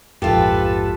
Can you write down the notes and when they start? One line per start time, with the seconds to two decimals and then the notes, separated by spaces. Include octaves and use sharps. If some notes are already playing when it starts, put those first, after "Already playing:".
0.22 A#1 F2 G#2 F4 G4 A4 B4